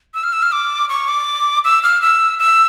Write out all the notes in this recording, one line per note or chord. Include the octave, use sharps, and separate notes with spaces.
E6
F6
E6
F6
D6
C#6
D6
E6
F6
E6
E6